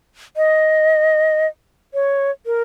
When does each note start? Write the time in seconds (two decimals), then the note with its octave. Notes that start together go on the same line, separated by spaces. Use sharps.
0.37 D#5
1.94 C#5
2.46 A#4